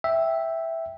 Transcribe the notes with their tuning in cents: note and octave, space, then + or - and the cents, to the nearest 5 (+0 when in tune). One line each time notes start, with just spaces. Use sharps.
E5 +0 G5 +0